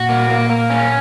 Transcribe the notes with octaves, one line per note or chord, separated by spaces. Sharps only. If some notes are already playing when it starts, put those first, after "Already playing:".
Already playing: A#2 F#4
A#3
A#3
A#3
C#4